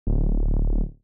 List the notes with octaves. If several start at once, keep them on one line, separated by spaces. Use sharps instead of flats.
D1